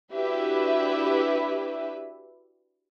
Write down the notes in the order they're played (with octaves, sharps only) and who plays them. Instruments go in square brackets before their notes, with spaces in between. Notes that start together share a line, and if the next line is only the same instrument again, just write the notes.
[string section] D4 E4 F#4 G4 B4 E5